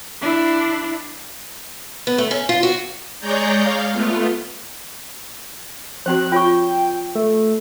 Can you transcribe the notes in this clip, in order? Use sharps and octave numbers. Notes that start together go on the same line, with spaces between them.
D4 E4
B3
A3
C#4
F4
F#4
G#3 G#4 C#5 D5 A#5 G6
F5
A3 B3 F4
F3 C4 F#4 F#6
F4 C#5 G5 C#6
A3